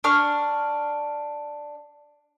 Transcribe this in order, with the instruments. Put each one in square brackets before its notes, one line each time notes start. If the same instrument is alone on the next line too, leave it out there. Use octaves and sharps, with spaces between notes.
[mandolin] D4 C#6 F6